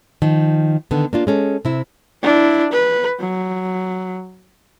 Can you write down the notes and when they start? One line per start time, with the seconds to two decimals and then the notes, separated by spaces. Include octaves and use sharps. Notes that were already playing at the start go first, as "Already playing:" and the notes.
0.22 D#3 F3
0.91 D3 D#3 B3
1.13 A#3 D4 F4
1.27 G#3 C#4 A4
1.65 C3 E4
2.23 D4 E4
2.73 B4
3.20 F#3